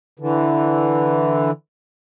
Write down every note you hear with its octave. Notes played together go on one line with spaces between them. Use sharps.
D3 E3